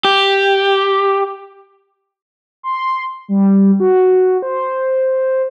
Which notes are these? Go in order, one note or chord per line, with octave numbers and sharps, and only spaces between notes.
G4
C6
G3
F#4
C5